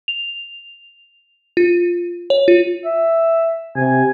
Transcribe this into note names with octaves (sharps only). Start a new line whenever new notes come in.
F7
F4
C#5
F4
E5
C3 G#5